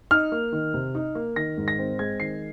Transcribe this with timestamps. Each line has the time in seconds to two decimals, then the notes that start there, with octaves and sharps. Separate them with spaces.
0.11 D#4 F6
0.32 A#3
0.52 D#3
0.74 C3
0.95 D#4
1.15 A#3
1.36 D#3 A#6
1.58 G#2
1.68 A#6
1.79 C4
1.99 G#3 G#6
2.20 D#3 C7